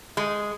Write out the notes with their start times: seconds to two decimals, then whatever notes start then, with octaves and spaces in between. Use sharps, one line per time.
0.17 G#3